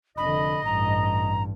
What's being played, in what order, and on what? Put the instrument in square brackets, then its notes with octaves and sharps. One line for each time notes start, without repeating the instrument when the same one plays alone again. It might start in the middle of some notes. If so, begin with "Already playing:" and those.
[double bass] F1 D3 [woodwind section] D#5 [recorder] B5
[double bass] A1 G2 [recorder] A#5